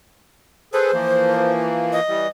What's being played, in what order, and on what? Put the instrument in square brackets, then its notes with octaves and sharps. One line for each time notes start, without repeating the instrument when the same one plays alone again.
[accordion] G#4 A4 B4 [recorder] C5
[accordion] E3 F3 A#3
[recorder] D#5
[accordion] E3 G3